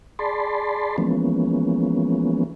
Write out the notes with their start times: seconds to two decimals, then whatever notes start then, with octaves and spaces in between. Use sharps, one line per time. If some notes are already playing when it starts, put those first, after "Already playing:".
0.19 G#4 D5 A5 B5 C6
0.98 E3 F3 G#3 A#3 B3 C#4